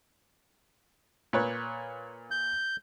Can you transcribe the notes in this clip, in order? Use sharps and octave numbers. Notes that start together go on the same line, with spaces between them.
A#2 B4 C#5
G6